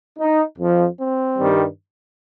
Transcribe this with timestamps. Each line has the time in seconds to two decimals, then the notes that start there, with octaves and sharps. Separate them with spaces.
0.19 D#4
0.59 F2 F3
0.99 C4
1.39 G2 D#3 G3